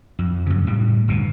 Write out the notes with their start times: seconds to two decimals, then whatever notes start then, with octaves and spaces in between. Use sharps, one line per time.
0.19 F2
0.46 F#2 C#3
0.67 A2 G3
1.08 G1 D2 B2